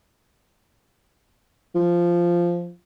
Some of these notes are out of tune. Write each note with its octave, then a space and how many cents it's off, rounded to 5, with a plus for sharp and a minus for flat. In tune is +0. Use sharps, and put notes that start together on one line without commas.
F3 -10